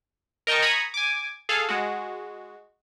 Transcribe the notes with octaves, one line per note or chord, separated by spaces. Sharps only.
A#4 D#5 G5 A5 C#6
G#5 A#5 B5 C#6 D#6 G#6
G#5 D6
G#4 A4 F5
G#3 F#4